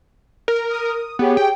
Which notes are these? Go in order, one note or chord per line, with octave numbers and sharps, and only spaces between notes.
A#4
D#6
B3 G4 G#4 C#5
G5